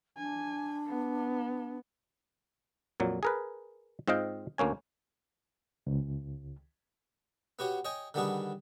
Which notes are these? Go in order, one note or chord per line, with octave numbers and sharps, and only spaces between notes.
D4 G#5
B3
F2 A#2 F#3
G#4 A#4 B4
G#2 C4 F4 D#5 F5 G5
D2 A#3 C#4 G#5
C#2
B3 F#4 G4 C#5
C#5 D#5 G5 G#5
D3 D#3 G3 B3 D4 G#4